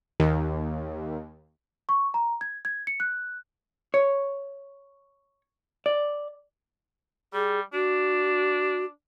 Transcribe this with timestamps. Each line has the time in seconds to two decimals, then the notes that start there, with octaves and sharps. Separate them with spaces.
0.20 D#2
1.89 C#6
2.14 A#5
2.41 G#6
2.65 G#6
2.87 C#7
3.00 F#6
3.94 C#5
5.86 D5
7.34 G3 G#4
7.73 D4 F#4